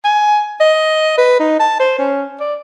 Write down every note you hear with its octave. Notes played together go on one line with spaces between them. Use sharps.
G#5
D#5
B4
D#4
A5
C5
C#4
D5